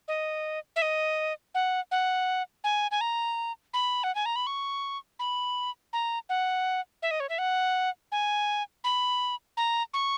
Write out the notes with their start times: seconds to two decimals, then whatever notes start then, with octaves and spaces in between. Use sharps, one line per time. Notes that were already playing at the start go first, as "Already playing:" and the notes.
0.08 D#5
0.76 E5
0.82 D#5
1.55 F#5
1.91 F#5
2.64 G#5
2.91 G#5
3.01 A#5
3.74 B5
4.04 F#5
4.15 G#5
4.26 A#5
4.36 B5
4.47 C#6
5.19 B5
5.93 A#5
6.29 F#5
7.02 E5
7.11 D#5
7.20 C#5
7.29 E5
7.38 F#5
8.12 G#5
8.84 B5
9.57 A#5
9.94 C#6